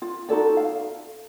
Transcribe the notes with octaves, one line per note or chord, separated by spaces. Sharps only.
F4
D#4 F#4 A4 D5
F5